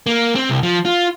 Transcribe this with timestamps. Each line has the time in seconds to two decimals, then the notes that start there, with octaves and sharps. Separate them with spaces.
0.06 A#3
0.35 C4
0.50 C2
0.63 F3
0.85 F4